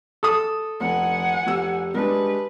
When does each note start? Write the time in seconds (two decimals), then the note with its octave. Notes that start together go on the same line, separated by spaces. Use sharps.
0.23 A4 D#6
0.80 F1 F#5 G#5
1.46 F1 G4 E6
1.94 G3 G#3 D4 B4